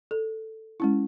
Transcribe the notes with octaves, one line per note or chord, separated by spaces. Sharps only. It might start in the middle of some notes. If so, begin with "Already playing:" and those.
A4
G#3 C#4 E4